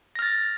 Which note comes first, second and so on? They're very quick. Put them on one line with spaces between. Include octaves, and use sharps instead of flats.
A#6 F6 A6